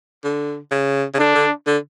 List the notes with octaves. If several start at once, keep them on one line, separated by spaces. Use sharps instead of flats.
D3
C#3
C#3
D3 D4
D3
D3